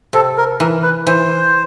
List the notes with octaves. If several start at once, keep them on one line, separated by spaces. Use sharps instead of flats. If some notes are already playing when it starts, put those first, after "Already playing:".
C3 A4
A#4
E3 A#4
B4
E3 C5